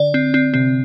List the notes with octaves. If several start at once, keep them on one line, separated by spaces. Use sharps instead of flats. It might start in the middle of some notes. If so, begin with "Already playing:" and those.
Already playing: D3 D5
C4
C4
C3 C4